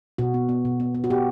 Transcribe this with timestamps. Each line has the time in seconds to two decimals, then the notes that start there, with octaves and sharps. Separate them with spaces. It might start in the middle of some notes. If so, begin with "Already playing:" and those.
0.18 B2 F#4
0.34 B3
0.49 B3
0.65 B2
0.80 B3
0.95 B3
1.04 F#4
1.10 B3 G4